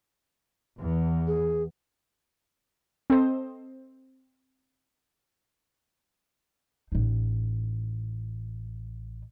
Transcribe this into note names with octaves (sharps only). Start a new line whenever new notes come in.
E2
G#4
C4 A4 C5 D#5
A1 D#4